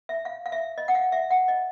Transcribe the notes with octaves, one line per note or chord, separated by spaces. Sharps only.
E5
F5
F5
E5
D#5
F#5
F5
E5
F#5
D#5